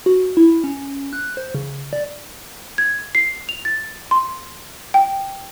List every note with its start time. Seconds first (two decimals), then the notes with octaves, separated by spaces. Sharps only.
0.06 F#4
0.37 E4
0.64 C#4
1.13 F#6
1.37 C5
1.54 C#3
1.93 D5
2.78 G#6
3.15 C7
3.49 F7
3.65 A6
4.11 C6
4.94 G5